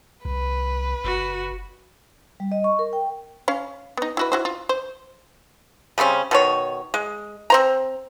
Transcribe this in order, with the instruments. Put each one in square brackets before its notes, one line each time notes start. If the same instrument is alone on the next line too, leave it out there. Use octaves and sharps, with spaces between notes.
[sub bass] C2 [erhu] B4
[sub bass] F#1 [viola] F#4
[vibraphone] G3
D#5
C#6
A#4
G5
[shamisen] C#4 F5
B3 D#4
E4 F#4 B4
E4 F#4 C5
F4
C5
[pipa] C#3 G3 C4 C#4
B2 D#3 C#5
G#3
C4 C5 A#5